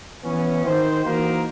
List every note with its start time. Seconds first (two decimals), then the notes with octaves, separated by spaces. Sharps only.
0.24 E3 B3 C#4
0.65 D#3 C5
1.05 E3 A#3 D#4 F#4 A#4 C5